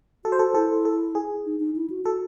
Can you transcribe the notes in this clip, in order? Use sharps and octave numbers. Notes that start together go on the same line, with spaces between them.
F#4 A4
C5
A4
E4 A4
A4
G#4
D#4
D#4
E4
F#4
F#4 A4